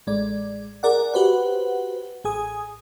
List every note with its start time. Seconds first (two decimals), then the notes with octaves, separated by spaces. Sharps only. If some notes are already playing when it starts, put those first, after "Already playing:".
0.07 A1 G#3 D5
0.83 G#4 A#4 D5 F#5
1.14 F#4 G4 B4 C5 F#5
2.24 A1 G#4 G#5 D#6